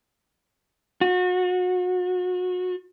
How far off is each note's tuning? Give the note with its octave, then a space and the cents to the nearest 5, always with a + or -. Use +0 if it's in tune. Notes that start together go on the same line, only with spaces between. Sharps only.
F#4 -30